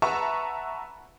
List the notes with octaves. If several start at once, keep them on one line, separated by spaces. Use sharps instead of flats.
B4 E5 F#5 A5 A#5 C#6